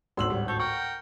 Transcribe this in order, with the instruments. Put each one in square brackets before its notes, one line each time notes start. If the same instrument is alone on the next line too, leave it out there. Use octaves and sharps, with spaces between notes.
[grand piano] G#1 D2 A2 [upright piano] C6 E6 F#7
[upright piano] G3
[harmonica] A4 C#5 [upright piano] G6
[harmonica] A#4 F#5 G5 [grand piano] C#6